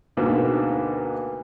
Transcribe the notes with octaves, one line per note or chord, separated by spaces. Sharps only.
D2 G#2 B2 A#3